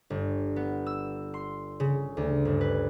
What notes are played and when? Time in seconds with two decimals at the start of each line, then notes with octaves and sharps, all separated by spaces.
0.10 G1
0.56 B3
0.86 E6
1.34 C6
1.80 C#3
2.17 D2
2.45 G1
2.61 B4